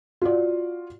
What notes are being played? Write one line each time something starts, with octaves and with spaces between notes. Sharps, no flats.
F4 F#4 D5